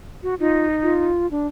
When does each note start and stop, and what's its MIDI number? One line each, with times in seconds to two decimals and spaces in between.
0.23 0.34 66
0.40 1.06 63
0.40 0.66 65
0.82 1.29 65
1.31 1.47 62